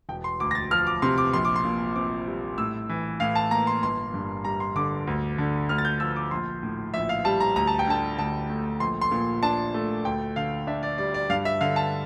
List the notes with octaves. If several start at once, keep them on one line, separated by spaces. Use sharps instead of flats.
E1 G5
C6
D2 D6
A#6
A6
F3 F6
D6
C3 C6
D6
A#1 C6
D6
C6
A#2
C4 D6
G3
A2 E6
E3
A2 F5
A5
A#3 A#5
C6
G1 C6
G2
G3 A#5
C6
D3 D6
D2
D3
D2 F6
A6
G6
F3 E6
D6
A#1 C6
A2
A#1 E5
F5
G3 A5
A#5
D2 A#5
A5
G5
D3 A5
D2 A5
A3
A#1 C6
C6
A#2
D4 A5
A3
D2 G5
D3 F5
D4 E5
D5
G3 D5
D5
G2 F5
E5
D3 F5
A5